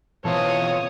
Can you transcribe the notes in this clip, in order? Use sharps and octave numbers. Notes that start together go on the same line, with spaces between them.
B2 E3 C4 F4 A4 C5 C#5 D#6